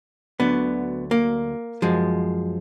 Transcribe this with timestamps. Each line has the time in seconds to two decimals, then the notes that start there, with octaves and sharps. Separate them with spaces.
0.40 D2 D3 F#3 B3
1.11 A#3
1.82 F#2 F3 G#3